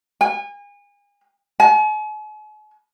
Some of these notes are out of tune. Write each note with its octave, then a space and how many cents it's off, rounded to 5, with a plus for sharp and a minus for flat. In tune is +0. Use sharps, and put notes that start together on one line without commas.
G#5 -35
G#5 +45